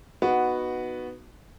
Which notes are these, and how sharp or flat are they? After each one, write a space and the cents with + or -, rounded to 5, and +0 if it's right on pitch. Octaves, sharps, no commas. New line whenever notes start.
B3 +0 D#4 +0 F#4 -5